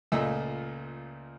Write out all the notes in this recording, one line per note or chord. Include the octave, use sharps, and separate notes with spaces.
C#2 A#2 A3 D#5 E6